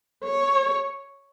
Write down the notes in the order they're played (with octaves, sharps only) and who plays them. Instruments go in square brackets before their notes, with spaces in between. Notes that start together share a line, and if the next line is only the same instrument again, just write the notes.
[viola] C#5